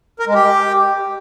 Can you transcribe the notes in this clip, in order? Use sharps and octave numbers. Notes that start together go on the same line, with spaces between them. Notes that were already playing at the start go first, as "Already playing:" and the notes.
A#4
G#3
G4